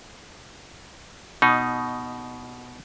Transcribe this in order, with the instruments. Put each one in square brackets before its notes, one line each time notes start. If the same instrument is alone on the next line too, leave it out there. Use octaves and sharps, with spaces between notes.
[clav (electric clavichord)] B2 D#4